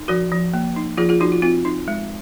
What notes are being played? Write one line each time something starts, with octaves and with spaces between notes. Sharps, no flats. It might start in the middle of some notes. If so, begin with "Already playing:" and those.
Already playing: D#4
F3 F#4 A#4
F3
A#3
D#4
F3 F4 G#4
F4 G#4
F3 D#4 F#4
F4
C4 F4
D#4
G#3